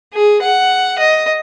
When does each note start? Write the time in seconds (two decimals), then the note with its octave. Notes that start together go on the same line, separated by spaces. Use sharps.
0.13 G#4
0.42 F#5
0.98 D#5